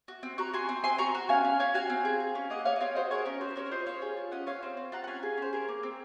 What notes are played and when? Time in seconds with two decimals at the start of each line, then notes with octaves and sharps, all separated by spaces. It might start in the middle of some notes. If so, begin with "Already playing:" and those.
0.08 F#4
0.23 C4
0.38 F#4 A#5 C#6
0.53 F#4 G#5 C6
0.69 C4
0.84 C4 G#5 C6
0.98 F#4 A#5 C#6
1.14 F#4
1.29 C#4 F5 G#5
1.44 C#4
1.59 C#4 C#5 F5
1.74 F#4 F5 G#5
1.89 C4
2.05 G#4
2.20 G#4
2.35 C#4
2.50 A#3 D#5 F#5
2.65 C#4 C#5 F5
2.76 D#5
2.80 C4 C#5 F5
2.95 F#4 C5 D#5
3.11 G#4 A#4 C#5
3.25 C#4 A#4
3.41 F#4 C5
3.56 C#4 A#4 C#5
3.71 F4 C5 D#5
3.86 C#4 C#5 F5
4.02 G#4
4.17 F4
4.31 C#4 D#5 F#5
4.46 F4 C#5 F5
4.63 C4 C5
4.77 C4
4.92 F4 F#5 A#5
5.04 F#5
5.07 C#4 F5 G#5
5.23 G#4
5.37 C#4 C5
5.53 G#4 A#4
5.68 A#3
5.83 C4